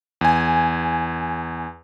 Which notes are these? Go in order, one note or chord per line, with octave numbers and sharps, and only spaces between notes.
E2 G#5